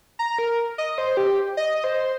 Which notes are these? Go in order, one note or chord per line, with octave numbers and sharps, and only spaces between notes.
A#5
A#4
D#5
C5
G4
D#5
C5